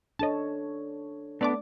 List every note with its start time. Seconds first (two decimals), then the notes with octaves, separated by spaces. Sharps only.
0.19 D4 A4 C#5 D#5 A5
1.41 A3 B3 D4 D5 D6